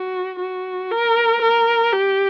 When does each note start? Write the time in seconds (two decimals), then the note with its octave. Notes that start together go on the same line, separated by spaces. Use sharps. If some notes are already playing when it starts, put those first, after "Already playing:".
Already playing: F#4
0.39 F#4
0.91 A#4
1.42 A#4
1.93 G4